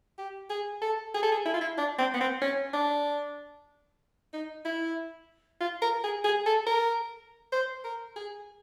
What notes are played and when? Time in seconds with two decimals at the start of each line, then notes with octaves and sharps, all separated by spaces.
0.18 G4
0.50 G#4
0.82 A4
1.14 G#4
1.23 A4
1.32 G#4
1.46 E4
1.54 F4
1.61 E4
1.78 D4
1.99 C4
2.14 B3
2.20 C4
2.42 C#4
2.74 D4
4.33 D#4
4.65 E4
5.61 F4
5.82 A#4
6.04 G#4
6.24 G#4
6.46 A4
6.67 A#4
7.52 C5
7.84 A#4
8.16 G#4